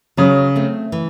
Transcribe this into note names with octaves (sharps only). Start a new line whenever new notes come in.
C#3 F#3
A3 C4
E3